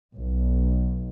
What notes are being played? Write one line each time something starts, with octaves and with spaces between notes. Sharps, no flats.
B1